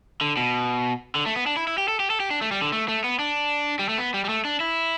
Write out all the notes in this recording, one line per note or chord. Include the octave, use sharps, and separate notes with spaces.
D3
B2
D3
A3
B3
D4
E4
E4
G4
A4
G4
A4
G4
D4
A3
G3
D3
A3
A3
B3
D4
G3
A3
B3
G3
G3
A3
D4
E4